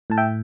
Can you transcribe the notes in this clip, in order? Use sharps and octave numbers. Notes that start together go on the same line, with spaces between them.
A2 A5
E5 G5